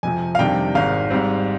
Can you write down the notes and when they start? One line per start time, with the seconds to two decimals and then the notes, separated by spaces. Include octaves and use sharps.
0.03 F2 C3 F3 G#5
0.35 F5
0.39 F2 C3 D#3 G3 D4 G5
0.75 G#1 G#2 D#3 F5
1.10 G#2 G3 C4